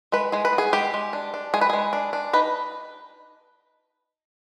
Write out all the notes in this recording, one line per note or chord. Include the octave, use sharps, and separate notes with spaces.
G#3 B4
G#3 G#4
B4
B3
G#4
G#3 G4
G#3
D4
D4
G#3 G#4
B4
G#3 G#4
D4
D4
D#4 B4